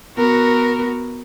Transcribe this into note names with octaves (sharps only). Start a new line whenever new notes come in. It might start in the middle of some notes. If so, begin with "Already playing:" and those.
B3 F#4 A#4